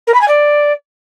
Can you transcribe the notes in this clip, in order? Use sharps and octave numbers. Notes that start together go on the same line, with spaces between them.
A#4
B5
G#5
D5